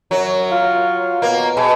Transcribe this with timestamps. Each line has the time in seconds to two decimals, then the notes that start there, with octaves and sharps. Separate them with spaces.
0.11 F#2 F#3
0.52 F4
1.22 B2 A#3
1.57 B2 G#4